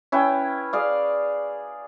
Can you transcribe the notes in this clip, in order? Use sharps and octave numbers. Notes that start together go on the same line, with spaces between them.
C#4 E4 B4 G5
G#4 D5 F5